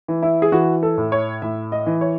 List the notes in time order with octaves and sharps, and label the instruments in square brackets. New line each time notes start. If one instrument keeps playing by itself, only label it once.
[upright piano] E3
E4
G#4
E3 F#4
A4
A2
C#5
A2 E5
D#5
E3
C#5